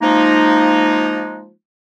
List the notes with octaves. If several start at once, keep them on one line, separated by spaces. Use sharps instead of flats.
F3 G#3 A#3 D#4